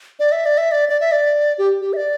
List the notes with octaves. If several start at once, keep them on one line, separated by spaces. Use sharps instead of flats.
D5
E5
D5
E5
D5
D5
E5
D5
G4
G4
E5
D5